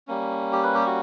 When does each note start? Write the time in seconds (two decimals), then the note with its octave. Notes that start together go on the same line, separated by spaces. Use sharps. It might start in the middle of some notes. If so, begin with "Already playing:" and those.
0.08 G3 A#3 C#4
0.53 G4
0.63 B4
0.75 G4
0.86 F#4